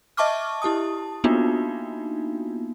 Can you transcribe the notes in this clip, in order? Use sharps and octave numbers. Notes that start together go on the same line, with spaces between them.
D#5 E5 A5 C#6 D6 F6
E4 G4 A5 D#6
A#3 B3 D4 D#4 F4 F#4